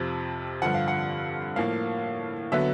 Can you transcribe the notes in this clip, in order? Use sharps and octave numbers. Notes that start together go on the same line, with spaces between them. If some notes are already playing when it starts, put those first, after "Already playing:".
Already playing: F2 C3 F3
G2 D3 F3 F#5
F5
F#5
A2 F3 A#3 F5
D3 F#3 B3 E5